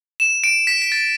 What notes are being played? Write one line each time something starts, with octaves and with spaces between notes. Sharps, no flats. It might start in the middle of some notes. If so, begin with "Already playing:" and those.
E7
D7
B6
B6
A6